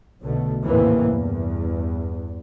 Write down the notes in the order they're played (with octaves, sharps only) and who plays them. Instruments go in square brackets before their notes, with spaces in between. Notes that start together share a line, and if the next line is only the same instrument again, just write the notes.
[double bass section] B1 B2 D3 A3
A1 D#2 G#2 C3 E3 A#3
E2 G2